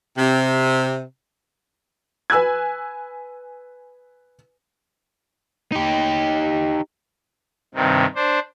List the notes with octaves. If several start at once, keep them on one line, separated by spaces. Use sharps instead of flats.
C3
B4 G#5 E6 F#6 G#6
D#4 G4
G2 C3 D#3
D4 C5